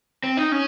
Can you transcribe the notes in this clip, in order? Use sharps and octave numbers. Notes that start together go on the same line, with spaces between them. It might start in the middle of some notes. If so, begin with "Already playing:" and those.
C4
D#4
C#4